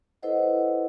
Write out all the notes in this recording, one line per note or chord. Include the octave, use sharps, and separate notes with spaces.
E4 A4 B4 C5 D#5 F#5